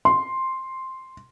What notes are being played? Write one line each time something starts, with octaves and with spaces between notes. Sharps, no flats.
C6